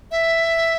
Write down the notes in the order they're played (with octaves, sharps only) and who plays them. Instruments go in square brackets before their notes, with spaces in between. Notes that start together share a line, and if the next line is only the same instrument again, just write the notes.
[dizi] E5